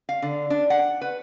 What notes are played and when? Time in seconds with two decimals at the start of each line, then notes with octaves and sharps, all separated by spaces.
0.09 F5
0.22 D3
0.50 D4
0.70 F#5
1.01 B4